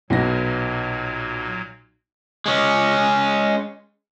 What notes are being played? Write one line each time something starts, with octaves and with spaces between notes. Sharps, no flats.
B1 A#2 F#3 B3 A#6
G#3 C#4